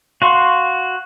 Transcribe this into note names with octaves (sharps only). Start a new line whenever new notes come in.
F#4 F5 C6 C#6